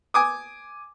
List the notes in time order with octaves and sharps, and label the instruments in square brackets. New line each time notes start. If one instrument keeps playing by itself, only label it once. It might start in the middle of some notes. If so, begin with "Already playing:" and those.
[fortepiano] G#5 D6 D#6